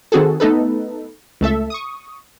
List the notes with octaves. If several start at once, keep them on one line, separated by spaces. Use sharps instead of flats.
D#3 C4 F#4 G#4 A4
A3 B3 D#4 A4 B4
C#2 A3 A4 E5
C#6 D#6